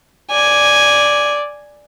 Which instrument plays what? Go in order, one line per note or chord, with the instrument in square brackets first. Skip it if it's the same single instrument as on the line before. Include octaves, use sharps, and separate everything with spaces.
[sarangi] D5 [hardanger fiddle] G#5